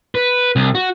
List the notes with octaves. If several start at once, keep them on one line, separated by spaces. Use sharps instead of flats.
B4
C2
F#4